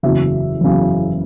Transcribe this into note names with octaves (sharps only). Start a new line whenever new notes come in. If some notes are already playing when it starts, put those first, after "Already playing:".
F#1 E2 C#3 F#3 E5
F#1 E2 C#3 F#3